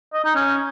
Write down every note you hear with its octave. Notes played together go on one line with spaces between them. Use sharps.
D#5
D#4
C#4